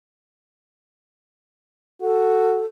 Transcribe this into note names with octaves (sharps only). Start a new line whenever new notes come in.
F#4 A4